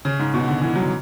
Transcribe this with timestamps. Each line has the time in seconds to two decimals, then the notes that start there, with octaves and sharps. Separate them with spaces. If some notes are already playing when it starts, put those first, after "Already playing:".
0.05 C#3
0.19 G#2
0.34 B2
0.47 D3
0.61 E3
0.76 F#3